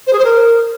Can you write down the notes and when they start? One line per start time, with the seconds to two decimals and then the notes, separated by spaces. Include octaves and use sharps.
0.07 C5
0.13 G#4
0.18 C5
0.24 A#4